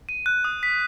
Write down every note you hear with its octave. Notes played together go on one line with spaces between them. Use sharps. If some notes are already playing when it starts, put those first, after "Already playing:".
D#7
F#6
D#6
B6